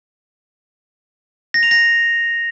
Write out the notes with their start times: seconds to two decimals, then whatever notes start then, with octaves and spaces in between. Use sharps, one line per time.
1.54 A#6
1.63 F7
1.71 A#6